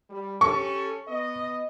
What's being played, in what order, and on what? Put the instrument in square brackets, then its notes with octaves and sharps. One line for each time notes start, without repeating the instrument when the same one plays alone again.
[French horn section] G3
[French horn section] C#4 G4 A4 [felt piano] C#6
[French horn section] B3 D#5